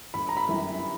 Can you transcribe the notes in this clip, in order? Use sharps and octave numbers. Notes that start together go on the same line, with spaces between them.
G1 B5
A#5
B5
F#2 E3 G3